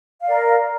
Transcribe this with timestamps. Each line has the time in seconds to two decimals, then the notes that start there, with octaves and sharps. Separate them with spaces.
0.21 F5
0.24 D5
0.28 A#4